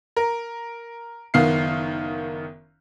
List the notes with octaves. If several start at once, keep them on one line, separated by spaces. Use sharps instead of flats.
A#4
F#1 D#3 B3 F5 C7